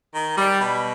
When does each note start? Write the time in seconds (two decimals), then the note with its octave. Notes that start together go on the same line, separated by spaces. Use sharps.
0.15 D#3
0.38 G3
0.60 B2